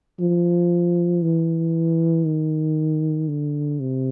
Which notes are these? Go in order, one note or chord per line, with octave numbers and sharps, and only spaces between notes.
F3
E3
D#3
D3
C3